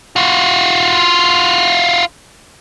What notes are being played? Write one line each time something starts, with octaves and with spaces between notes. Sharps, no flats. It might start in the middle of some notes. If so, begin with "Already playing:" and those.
F4 F#4